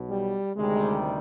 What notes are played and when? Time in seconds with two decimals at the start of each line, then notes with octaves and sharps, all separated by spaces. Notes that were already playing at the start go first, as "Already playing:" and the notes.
Already playing: B1 B2
0.10 G3
0.56 D2 C3 D#3 G3 G#3